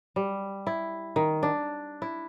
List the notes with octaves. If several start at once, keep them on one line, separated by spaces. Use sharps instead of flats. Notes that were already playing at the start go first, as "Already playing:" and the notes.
G3
E4
D#3
D4
E4